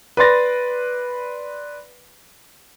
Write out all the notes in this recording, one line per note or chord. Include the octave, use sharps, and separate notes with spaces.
B4 D5 B5 C6 A6 A#6